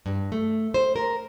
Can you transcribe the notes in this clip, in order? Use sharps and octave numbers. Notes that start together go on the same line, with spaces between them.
G2
A3
C5
A#4